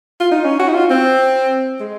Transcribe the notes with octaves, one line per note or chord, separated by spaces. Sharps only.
F4
D#4
C#4
F#4
D#4
F4
C4
G#3